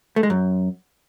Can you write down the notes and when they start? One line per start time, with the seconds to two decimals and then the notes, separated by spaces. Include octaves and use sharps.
0.16 A3
0.23 G#3
0.30 F#2